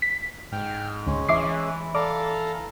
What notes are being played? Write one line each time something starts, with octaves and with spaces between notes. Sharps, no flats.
B6
G#2 G5 F6
D2 G#3 C#4
E3 E5 D6 C7
A4 D5 F5 A#5